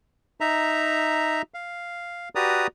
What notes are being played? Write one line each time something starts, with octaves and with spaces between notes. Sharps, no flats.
D#4 E5 A#5
F5
F#4 G4 B4 D5 A#5 D#6